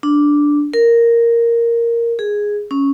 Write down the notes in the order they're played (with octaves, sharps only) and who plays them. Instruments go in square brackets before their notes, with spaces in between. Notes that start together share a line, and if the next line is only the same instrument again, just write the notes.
[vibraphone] D4
A#4
G#4
C#4